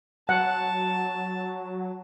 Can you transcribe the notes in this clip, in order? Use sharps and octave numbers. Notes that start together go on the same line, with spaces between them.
F#3 F#5 A5